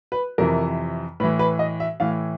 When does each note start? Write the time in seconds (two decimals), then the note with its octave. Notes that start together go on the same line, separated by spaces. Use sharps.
0.12 B4
0.38 F2 C3 E3 A#4
1.20 A2 E3 B4
1.39 B4
1.59 D#5
1.80 E5
2.00 A2 E3 F5